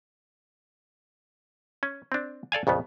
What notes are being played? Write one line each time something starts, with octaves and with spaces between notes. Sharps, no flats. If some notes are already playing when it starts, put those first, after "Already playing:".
C#4
C4 D4
A4 D5 F5 G#5
A#1 F2 C#3 B3